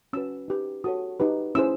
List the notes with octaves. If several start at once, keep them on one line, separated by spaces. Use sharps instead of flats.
C#4 F#4 B4 E6
D#4 G4 B4
F#4 A4 C#5 D#6
D#4 G4 B4
C#4 E4 G#4 C5 E6